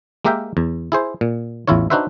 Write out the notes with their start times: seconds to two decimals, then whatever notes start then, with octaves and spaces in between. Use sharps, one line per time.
0.25 G#3 A#3 G4 A#4 E5 G5
0.57 E2
0.92 E4 G#4 C5
1.21 A#2
1.68 A1 E2 E4 F4 C#5
1.90 D4 D#4 F#4 B4 C5 E5